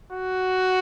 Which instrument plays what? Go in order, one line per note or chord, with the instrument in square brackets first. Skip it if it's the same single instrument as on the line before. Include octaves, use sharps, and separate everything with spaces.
[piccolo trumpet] F#4